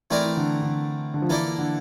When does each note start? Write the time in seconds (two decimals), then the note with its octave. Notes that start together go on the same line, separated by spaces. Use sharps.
0.10 E3 A3 C4 E4 A#4 D5
0.25 E3
0.37 D3
0.62 D3
1.14 D3
1.22 F3
1.29 E3 A#3 E4 A4 D5
1.58 D3